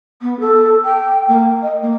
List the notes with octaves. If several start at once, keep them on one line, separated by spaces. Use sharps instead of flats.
B3
A4
G5
A#3
D#5
A#3